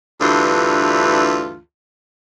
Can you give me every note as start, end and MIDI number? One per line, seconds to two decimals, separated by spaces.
0.21 1.58 38
0.21 1.58 43
0.21 1.58 52
0.21 1.58 65